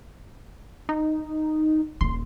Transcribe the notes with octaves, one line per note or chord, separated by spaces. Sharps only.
D#4
D#1 C#3 C6